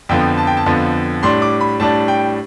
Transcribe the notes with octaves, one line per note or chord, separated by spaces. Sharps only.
F2 D3 F3 B3 G5
A5
G5
A5
F2 D3 F3 B3
A2 G3 D4 C6
D6
B5
A2 G3 D4 A5
G5